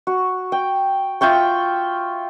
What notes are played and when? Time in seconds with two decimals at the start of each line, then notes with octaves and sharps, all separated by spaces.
0.07 F#4
0.52 G5
1.21 F4 E5 G5 C#6